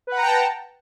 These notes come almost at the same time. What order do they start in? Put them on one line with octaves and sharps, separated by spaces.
B4 F#5 A#5 G5 A5